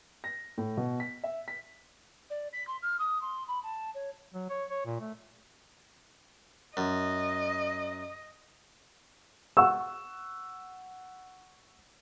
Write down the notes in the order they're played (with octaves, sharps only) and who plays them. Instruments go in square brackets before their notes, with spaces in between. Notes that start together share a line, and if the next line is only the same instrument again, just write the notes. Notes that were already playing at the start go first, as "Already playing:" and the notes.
[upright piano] A#6
A2
B2
B6
E5
B6
[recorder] D5
B6
C6
F6
D#6
C6
B5
A5
C#5
[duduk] F#3
C#5
C#5
A#2
A3
[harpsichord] F#2 [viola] D#5
[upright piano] F#5 C#6 E6